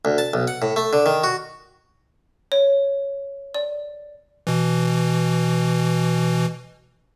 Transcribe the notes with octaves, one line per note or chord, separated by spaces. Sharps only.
D2
A5
B1
F#5
A2
A3
D3
D#3
F#4
C#5
D5
B2 E3